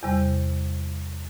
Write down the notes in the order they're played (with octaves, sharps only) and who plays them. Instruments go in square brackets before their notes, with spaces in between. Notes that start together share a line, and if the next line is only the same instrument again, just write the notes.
[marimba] E2 C3 G3